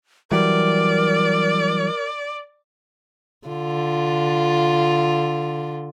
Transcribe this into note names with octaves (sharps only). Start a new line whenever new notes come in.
E3 F#3 G3 A#4 D5
D3 F4